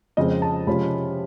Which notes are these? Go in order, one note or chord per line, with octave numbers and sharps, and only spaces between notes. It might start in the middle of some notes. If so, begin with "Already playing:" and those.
F2 C#3 F3 G#3 C4 D#5
A5
C3 F3 G#3 C#4 F4 B5